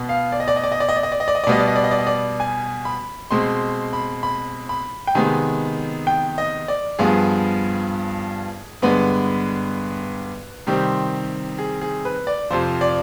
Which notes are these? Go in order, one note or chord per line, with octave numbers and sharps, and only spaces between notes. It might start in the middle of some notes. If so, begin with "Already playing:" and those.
Already playing: B2 B3
F5
D5
D#5
D5
D#5
D5
D#5
D5
D#5
D5
D#5
D5
D#5
D5
D#5
D5
B2 G3 B3 D#5
D5
D#5
D5
D#5
D5
D#5
D5
G#5
B5
B2 G#3 C4 C6
B5
B5
B5
G5
C3 D#3 G#3 B3 G#5
G5
D#5
D5
G2 F3 B3 G#4
G2 D3 G#3 B3 B4
C3 D#3 G3 C4 G4
G#4
G#4
B4
D5
F2 C3 F3 C5
D5